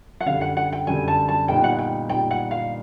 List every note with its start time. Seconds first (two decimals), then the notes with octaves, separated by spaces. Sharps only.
0.20 F#5
0.26 F#2 D3 G3 F5
0.41 F#5
0.57 F#5
0.73 G5
0.87 F#2 D3 G3 G#5
1.08 A5
1.28 A5
1.48 A#2 G3 B3 D#4 G5
1.64 F#5
1.79 G5
2.09 A#2 G3 B3 D#4 G5
2.31 F#5
2.51 F5